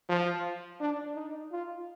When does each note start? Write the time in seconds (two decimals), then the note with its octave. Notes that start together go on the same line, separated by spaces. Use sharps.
0.09 F3
0.80 D4
1.15 D#4
1.52 F4